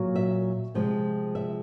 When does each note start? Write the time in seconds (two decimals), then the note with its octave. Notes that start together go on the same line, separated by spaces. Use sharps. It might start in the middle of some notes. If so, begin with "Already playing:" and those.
Already playing: A#2 F#3
0.16 E5
0.75 C3 F3 G#3
1.35 E5